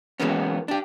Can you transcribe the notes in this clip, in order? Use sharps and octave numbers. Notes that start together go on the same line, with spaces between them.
E3 F#3 G#3 A#3 B3 C#4
D4 G4